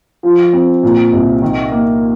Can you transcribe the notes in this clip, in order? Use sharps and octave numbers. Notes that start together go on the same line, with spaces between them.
F3
C4
A#2
C2
D#3
A#3